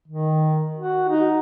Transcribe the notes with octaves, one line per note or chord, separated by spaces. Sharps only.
D#3
F#4
D#4